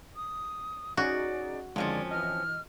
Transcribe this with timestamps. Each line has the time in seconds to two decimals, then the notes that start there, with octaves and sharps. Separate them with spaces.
0.16 D#6
0.97 C#4 D#4 F#4 G#4 D5
1.76 F2 D3 D#3 F3 G#3 C#4 D5
2.11 E3 D#5 F6